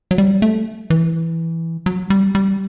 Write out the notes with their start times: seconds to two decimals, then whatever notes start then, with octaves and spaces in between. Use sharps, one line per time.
0.11 F#3
0.18 G3
0.42 A3
0.90 E3
1.86 F#3
2.10 G3
2.35 G3